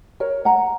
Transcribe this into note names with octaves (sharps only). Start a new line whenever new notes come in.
A#4 C#5
F#5 A#5